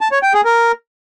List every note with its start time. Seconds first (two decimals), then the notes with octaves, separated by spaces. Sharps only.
0.01 A5
0.12 C#5
0.23 G5
0.34 G#4
0.45 A#4